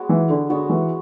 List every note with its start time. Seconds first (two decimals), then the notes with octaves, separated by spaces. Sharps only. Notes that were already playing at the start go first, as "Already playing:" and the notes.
Already playing: G#3 B3 F#4 C#5
0.09 E3
0.30 D3
0.50 D3 G#3 B3 F#4 C#5
0.69 E3